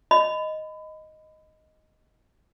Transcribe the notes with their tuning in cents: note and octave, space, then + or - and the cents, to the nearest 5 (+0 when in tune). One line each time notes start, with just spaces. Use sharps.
D#5 +0 B5 +25